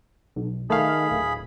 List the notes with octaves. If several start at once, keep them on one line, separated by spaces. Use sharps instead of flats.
B1
D#3 A3 G#4 F5 B5
D1